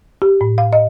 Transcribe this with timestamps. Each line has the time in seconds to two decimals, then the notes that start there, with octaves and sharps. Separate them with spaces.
0.22 G4
0.41 A2
0.58 F5
0.73 D#5